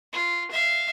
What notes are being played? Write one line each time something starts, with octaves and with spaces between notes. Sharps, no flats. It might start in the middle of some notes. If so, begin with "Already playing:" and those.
F4
E5 F5